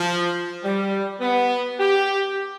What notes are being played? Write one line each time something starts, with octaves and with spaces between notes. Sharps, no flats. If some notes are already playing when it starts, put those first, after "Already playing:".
Already playing: F3
G3
B3
G4